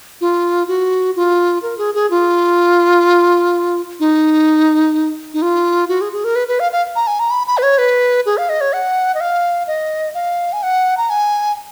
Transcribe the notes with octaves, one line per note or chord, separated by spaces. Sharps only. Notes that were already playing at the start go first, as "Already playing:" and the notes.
F4
F#4
F4
A#4
G#4
G#4
F4
D#4
D#4
F4
F#4
G#4
G#4
A#4
B4
B4
F5
F5
A#5
G#5
A#5
B5
B5
B4
C#5
B4
G#4
F5
D#5
C#5
F#5
D#5
F5
D#5
F5
G#5
F#5
A#5
G#5